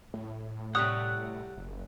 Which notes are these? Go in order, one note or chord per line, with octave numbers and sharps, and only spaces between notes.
A2
C3 G3 C#5 F#5 D#6 E6 F#6
F#1